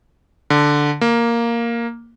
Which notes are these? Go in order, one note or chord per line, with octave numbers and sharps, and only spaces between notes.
D3
A#3